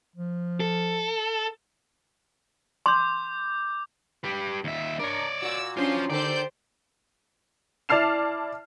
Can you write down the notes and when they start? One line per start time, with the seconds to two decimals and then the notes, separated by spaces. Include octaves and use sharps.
0.16 F3
0.60 A4
2.86 C6 D6 G6
4.24 G4 B4
4.64 D#2 E5
4.99 D4 A#4 C#5 D5
5.42 A#2 F#4 E6
5.77 C#4 D4 F4 C5 C6
6.10 D3 G4 A4 C5 D5 G6
7.89 E4 D5 A5 F6 C7 E7